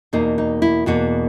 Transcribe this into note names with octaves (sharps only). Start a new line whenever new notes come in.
E2 B2 A#3 D#4
D#4
E4
E2 B2 A#3 F#4